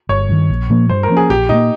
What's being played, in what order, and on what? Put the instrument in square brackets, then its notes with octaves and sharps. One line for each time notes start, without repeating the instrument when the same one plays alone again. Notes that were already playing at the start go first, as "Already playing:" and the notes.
[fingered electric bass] G1 [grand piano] C#5
[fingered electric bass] G2 D#3
A#1
A#2 F3 A#3
[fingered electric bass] G2 [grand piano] C5
[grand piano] A#4
[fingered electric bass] F3 A#3 C#4
[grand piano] G#4
[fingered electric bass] A#1 [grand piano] G4
[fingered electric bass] A#2 G3 A#3 [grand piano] D#4